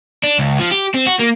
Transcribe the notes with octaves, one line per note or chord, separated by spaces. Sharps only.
D4
C#2
F3
G4
C4
F#4
A#3